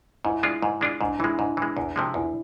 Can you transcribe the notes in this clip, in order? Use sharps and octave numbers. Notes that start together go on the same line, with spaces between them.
G#2 E4
G#3 D4 F4
G#2
G#3 D4 F4
G#2 D4
E3 G#3 E4
G#2 D4
E3 G#3
E2
C3 F3 G#3
E2 E4